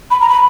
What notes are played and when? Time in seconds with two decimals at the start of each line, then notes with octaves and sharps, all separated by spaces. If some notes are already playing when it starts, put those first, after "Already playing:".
0.11 B5
0.21 A#5
0.29 B5